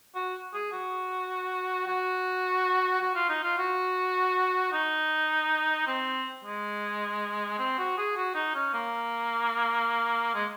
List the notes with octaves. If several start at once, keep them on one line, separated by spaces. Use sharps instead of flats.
F#4
G#4
F#4
F#4
F#4
F4
D#4
F4
F#4
D#4
C4
G#3
C4
F#4
G#4
F#4
D#4
C#4
A#3
G#3